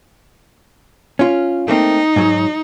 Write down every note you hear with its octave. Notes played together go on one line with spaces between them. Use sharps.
C#4 F4
A3 A#3 C4 D#4
G#2 F#3